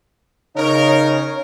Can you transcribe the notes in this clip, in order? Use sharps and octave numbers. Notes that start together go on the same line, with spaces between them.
C#3 D#4 A#4 C#5